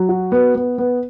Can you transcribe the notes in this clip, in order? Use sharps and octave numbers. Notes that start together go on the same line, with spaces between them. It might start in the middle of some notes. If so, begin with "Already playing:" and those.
Already playing: F#3
F#4
B3
B3
B3